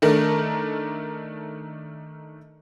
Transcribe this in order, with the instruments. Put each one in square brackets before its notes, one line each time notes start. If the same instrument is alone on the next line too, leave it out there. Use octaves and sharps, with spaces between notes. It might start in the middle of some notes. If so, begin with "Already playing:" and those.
[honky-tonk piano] D#3 A3 D4 A#4